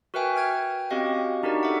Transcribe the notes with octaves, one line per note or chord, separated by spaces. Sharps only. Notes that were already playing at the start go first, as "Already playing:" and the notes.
F#4 A#4 B4 E5 G5 G#5
G5 F6 G#6
C4 C#4 F#4 G4 D#5 F5
D4 D#4 F#4 G4 A#4 D5
A4 E5 F#5